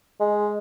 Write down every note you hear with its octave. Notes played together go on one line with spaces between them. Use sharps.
G#3